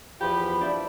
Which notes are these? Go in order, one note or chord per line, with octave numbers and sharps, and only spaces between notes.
E2 F3 G4 B5
D4 E4